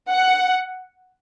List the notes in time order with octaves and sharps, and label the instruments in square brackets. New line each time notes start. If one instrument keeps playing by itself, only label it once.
[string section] F#5